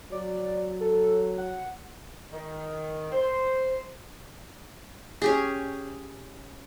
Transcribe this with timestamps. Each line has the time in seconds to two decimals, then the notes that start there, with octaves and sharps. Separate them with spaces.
0.12 F#3 D5
0.80 A4
1.38 F#5
2.32 D#3
3.12 C5
5.22 C#4 G4 G#4